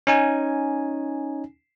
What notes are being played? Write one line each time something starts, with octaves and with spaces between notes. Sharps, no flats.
C#4 D#4 G#5